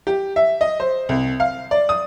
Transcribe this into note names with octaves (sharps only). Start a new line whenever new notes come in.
G4
E5
D#5
C5
C2
F5
D5
D#6